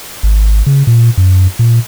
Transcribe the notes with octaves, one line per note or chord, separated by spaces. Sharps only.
G#1
C#3
A#2
F#2
A#2